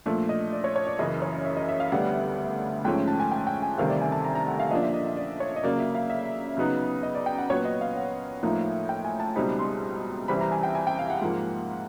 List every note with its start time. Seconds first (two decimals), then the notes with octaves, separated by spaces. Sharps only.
0.06 A#2 F3 A3 D4 D5
0.29 D#5
0.53 D5
0.64 C#5
0.76 C#5
0.87 D5
0.99 F#2 C#3 E3 D#5
1.22 C#5
1.45 E5
1.57 D#5
1.69 E5
1.80 F5
1.92 D2 D3 G3 B3 D4 F#5
2.85 G#2 F3 A3 C#4 G5
3.08 A5
3.20 G#5
3.31 G5
3.47 G5
3.62 G#5
3.77 D2 C3 D#3 G3 C4 F5
3.90 D5
4.01 G#5
4.12 A5
4.24 A#5
4.35 A#5
4.48 F#5
4.60 F5
4.71 A#2 F3 A#3 D4 D#5
4.83 E5
4.94 D#5
5.06 E5
5.17 D5
5.40 C#5
5.56 D#5
5.63 C#3 F#3 A#3 D5
5.79 E5
5.95 F5
6.10 E5
6.57 C#3 F#3 B3 D#4
7.03 D#5
7.15 D5
7.26 G5
7.38 F#5
7.50 A#2 F#3 B3 C#5
7.65 D#5
7.81 F5
7.96 F#5
8.43 A2 F3 A#3 D#4
8.89 G5
9.05 G#5
9.20 A5
9.35 C#2 B2 G3 C4 D#4 B5
9.59 C6
10.28 C2 C3 E3 G3 C4 B5
10.41 A#5
10.52 G#5
10.63 G5
10.75 G#5
10.87 G5
10.99 F5
11.10 F#5
11.21 G#2 F3 A#3